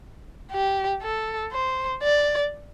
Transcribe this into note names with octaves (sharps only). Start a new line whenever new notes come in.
G4
A4
C5
D5